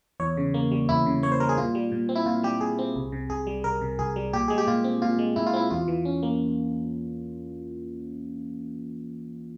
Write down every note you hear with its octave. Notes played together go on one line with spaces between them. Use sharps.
E2 C#5
C#3
A#3
G3
E2 E4
C#3
A#3 C#5
C5
G3 A#4
G#4
A#2 F4
G3
A#2
C4
E4
A#2 F4
G3 G4
A#2 G#4
C4
C2
C3
C2 G#4
G3
C2 A#4
C3
C2 G#4
G3
A#2 G4
G#3 G#4
G4
A#2 F4
C4
A#2 F4
G#3
A#2 E4
F4
C4 E4
E2 F4
E3
C#4
A#3